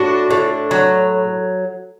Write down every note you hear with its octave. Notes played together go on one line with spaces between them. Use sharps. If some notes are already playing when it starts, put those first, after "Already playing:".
Already playing: A2 D4 F#4
A2
F#3